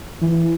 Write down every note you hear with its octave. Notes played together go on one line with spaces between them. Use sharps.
E3